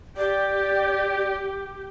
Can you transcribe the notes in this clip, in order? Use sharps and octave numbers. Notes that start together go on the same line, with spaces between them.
G4 D5